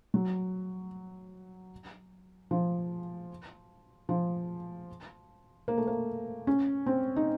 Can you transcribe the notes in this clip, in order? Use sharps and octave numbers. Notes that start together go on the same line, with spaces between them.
F#3
F3
F3
A#3
A3
A#3
C#4
C4
D#4